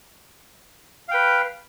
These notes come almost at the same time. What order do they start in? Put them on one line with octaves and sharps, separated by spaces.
F5 G5 B4